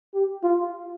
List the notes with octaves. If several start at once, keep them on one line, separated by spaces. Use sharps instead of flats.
G4
F4